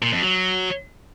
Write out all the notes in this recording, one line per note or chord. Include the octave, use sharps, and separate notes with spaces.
A#2
F2
F#3